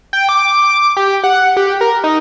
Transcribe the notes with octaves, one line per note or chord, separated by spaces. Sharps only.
G5
D6
G4
F#5
G4
A#4
D#4